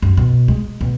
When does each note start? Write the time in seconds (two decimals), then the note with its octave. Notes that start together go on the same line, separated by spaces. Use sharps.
0.02 F#2
0.17 B2
0.48 G#3
0.81 B2